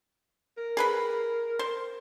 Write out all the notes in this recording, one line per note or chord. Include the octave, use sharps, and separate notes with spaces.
A#4
G#4 B4 B5
C5